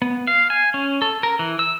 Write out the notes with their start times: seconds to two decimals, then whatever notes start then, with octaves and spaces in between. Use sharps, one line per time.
0.02 B3
0.27 F5
0.50 G#5
0.74 C#4
1.02 A4
1.23 A#4
1.39 E3
1.59 E6